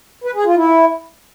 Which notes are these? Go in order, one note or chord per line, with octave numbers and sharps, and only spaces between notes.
B4
G#4
F4
E4